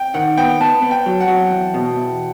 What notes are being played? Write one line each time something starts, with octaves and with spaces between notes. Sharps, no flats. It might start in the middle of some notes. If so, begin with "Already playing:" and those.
Already playing: G5
D#3 F#5
B3 G5
B3 A5
B3
G5
F#3
F#5
F#3
E2
B2
E2